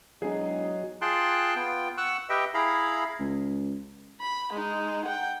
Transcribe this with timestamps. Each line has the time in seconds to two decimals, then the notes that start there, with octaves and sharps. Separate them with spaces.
0.22 E1 F#3 D#4 G#4
1.02 F4 G#4 G5 A5 C6 F#6
1.56 B3 F4 G5
1.98 F#5 C#6 E6 F#6
2.29 G4 B4 D#5 E5 G5
2.54 E4 G#4 F5 A#5 B5
3.19 C#2
4.21 B5
4.53 G#3 D#4
5.05 F#5 G5